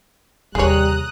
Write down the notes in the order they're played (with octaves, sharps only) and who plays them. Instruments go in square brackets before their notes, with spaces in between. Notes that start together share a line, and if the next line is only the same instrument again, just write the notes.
[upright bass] D#2 C3 [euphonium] G3 [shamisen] G#4 C#5 [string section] A#5 D#6 F#6